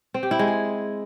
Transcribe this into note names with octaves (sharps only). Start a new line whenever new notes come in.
C4
G4
E4
G#3
G#4